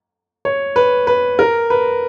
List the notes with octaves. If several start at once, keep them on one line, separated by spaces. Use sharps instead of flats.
C#5
B4
B4
A#4
B4